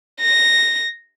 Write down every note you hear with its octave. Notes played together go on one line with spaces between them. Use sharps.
A#6